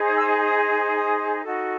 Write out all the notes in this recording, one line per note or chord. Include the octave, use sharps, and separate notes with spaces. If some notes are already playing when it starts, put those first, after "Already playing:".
Already playing: D#4 G#4 C5
E6
D#6
D#6
D#4 F#4 A4